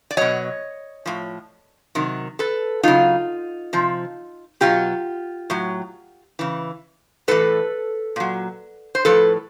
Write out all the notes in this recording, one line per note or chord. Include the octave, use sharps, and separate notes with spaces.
D5
B2 F#3 C#5 D#5
A2 F3
C3 D#3 F#3
A4 B4
C#3 F#3 D#4 F4
C3 F3
B2 F#3 F4 G4
A2 F#3
C#3 E3
A2 E3 A4 B4
A#2 F#3
C5
A2 F3 A4 B4